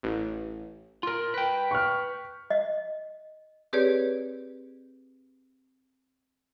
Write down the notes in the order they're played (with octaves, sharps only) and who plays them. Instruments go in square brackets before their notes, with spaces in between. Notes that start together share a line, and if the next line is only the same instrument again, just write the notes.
[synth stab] A1
[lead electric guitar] F4 A#4
B4 G5
[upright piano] C#6 F6
[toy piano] D#5
[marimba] C4 G4 G#4 B4 C#5 D5